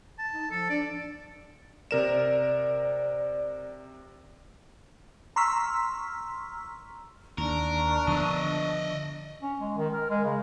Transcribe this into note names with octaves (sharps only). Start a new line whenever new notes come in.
A5
D#4
F3 A4
D4 D5
C3 A#4 D5 E7
A#5 C6 C#6 E6 F6 B6
D#2 D4 A#4 C#6
D3 F3 B3 D#5 E5
C#4
G#3
D#3
A#4
G#3
C#3